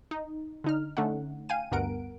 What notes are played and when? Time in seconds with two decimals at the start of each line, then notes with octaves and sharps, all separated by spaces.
0.11 D#4
0.64 D3 D#4 F6
0.97 D3 A3 C#4 D#4 F#5
1.49 F5 G5 G#5 D#7
1.72 D2 G2 B3 A#4 F#5 D7